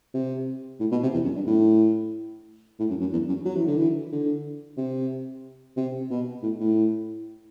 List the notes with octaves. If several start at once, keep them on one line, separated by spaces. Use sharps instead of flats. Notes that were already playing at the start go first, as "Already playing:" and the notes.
C3
A2
B2
C3
E2
F#2
G2
A2
A2
F#2
F#2
E2
F#2
F#3
E3
D3
E3
D3
C3
C3
B2
A2
A2